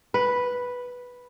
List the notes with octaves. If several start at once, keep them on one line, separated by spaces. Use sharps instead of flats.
B4